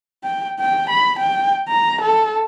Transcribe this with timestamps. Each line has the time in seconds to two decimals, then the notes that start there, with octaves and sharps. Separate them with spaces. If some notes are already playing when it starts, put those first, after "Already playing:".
0.24 G5
0.60 G5
0.91 B5
1.20 G5
1.68 A#5
2.02 A4